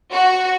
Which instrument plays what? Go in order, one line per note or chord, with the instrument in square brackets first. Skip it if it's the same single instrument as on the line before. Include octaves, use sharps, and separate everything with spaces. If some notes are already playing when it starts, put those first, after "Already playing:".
[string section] F#4